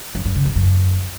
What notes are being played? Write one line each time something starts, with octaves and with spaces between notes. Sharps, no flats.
F#2
F#2
C#3
F#2
F#2